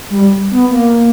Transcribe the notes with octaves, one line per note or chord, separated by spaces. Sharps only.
G3
B3
A#3